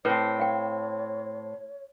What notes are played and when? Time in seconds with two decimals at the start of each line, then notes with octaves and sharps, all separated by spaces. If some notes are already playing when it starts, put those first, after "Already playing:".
0.05 A2 C4 B4 C#5
0.40 F5 G5